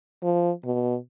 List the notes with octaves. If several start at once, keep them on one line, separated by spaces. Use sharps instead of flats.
F3
B2